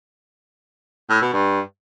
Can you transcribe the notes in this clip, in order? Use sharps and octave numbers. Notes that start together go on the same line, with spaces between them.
A2
B2
G2